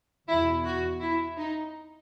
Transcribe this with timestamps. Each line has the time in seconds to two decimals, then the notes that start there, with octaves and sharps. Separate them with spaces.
0.28 E2 B2 E4
0.65 F#4
1.01 E4
1.37 D#4